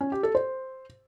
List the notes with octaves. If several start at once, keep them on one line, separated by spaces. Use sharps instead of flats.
C#4
G4
A4
C5